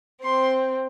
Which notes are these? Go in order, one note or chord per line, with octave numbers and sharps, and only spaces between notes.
C4 C6